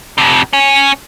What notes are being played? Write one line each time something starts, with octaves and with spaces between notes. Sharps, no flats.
F2 C3
C#4